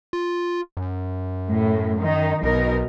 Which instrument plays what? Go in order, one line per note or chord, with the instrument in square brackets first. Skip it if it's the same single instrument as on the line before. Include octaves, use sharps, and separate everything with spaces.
[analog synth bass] F4
F#2
[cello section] A2
D#3 D#4
[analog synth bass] B1 [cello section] B2 D#4 A#4